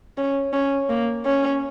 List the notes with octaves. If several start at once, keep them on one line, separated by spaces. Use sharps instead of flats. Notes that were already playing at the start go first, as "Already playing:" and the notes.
C#4
C#4
A#3
C#4